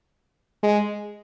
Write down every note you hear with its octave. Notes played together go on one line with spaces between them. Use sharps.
G#3